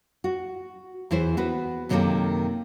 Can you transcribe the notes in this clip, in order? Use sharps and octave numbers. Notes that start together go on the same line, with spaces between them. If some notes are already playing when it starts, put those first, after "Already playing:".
F#4
E2 E3 E4 C5
B3 F#4 B4
F#2 C3 D#3 G#3 A#3 A4